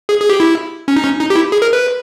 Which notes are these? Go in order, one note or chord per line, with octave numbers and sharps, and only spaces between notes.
G#4
G#4
G4
E4
C#4
D#4
C#4
D#4
G4
E4
G#4
A#4
B4